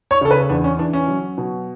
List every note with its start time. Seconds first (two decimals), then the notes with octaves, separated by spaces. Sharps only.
0.11 C#5
0.21 C#3 A4
0.31 B4
0.49 E2 D4
0.64 C#4
0.79 E3 D4
0.93 C#4
1.08 F#3
1.38 B2